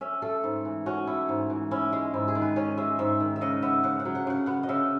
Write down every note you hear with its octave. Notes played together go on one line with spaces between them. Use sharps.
C#4 E5
A3 A4
G#2
E3
C#4 F#4
A3 E4
G#2
E3
C#4 E4
G#3
G#2 E4
G#4
D#3
B4
C#4 C#5
G#3 E5
G#2 E5
D#3
E5
C#3 D#5
B3 E5
C#3 F#5
F#5
F#3
F#5
C#3 F#5
B3 F#5
D#5
C#3 E5